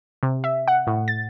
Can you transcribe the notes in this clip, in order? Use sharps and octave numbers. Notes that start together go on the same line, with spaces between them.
C3
E5
F#5
A2
A6